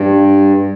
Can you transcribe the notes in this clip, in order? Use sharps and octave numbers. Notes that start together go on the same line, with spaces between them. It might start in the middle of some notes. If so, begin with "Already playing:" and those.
Already playing: G2